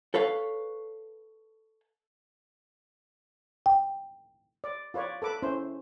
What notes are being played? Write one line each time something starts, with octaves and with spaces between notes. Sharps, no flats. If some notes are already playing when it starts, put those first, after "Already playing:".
A4 B4 C#5 F5
G5
D5
F4 B4 C#5 D5
A4 B4 D6
C#4 E4 C5